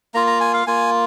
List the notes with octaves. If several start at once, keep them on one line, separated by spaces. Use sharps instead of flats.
A#3 F4 A#5
A#5
G#5
F5
A#3 F4 G#5